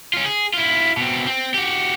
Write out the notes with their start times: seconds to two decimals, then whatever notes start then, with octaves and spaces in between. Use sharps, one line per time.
0.13 C#4 F4
0.26 G#4
0.54 E4 F4
0.97 B2 C4
1.27 C4
1.54 F#4 G4